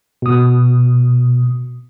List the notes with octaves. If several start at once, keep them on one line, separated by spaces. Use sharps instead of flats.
B2 D#6